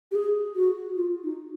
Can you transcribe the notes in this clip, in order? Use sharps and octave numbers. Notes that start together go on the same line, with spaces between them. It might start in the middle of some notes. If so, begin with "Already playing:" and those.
G4
G#4
F#4
F4
D#4